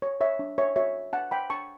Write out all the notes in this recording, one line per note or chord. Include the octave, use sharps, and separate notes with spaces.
C#5
C#5 E5
D4
C#5 E5
F#4 C#5 E5
D4 F#5 A5
G5 B5
D4 A5 C#6